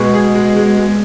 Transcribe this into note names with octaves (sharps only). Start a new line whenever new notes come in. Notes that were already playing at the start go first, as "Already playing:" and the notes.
Already playing: B2 G#3
G#4
G#3
G#3
G#3